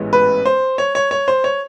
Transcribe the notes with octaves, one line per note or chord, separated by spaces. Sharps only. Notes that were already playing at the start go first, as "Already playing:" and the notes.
Already playing: A1 G#2 E3 G#3 B3
B4
C5
C#5
C#5
C#5
C5
C#5